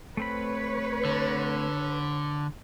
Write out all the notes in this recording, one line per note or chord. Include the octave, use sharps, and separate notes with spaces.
A3 C4 B4 C#5 B5
D3